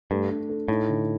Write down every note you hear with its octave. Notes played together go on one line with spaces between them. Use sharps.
G2 A3
D4
A4
A2 D#4
D3